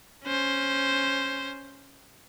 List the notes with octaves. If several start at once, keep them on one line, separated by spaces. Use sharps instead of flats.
C#4 C5